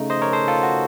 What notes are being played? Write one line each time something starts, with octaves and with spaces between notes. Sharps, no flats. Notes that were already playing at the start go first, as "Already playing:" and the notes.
Already playing: C#3 A3 D#4
C5 D#5
A#4 C#5
A4 C5
F4 A4
F#4